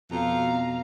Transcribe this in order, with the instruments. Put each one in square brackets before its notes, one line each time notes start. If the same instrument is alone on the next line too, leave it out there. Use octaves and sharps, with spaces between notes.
[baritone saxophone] F2 [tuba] B2 [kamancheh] F5 A#5